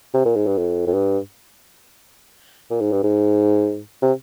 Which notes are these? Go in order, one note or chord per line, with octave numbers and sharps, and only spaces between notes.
C3
A#2
G#2
G2
F2
F2
G2
A#2
G#2
G2
G#2
C3